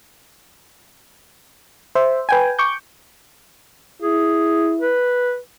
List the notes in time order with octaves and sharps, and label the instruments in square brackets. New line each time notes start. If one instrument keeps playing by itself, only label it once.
[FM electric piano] C5 E5
B4 G5 G#5
C#6 D6 G6
[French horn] E4 [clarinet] G#4
[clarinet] B4